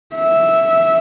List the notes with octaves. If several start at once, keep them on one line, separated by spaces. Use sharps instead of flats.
E5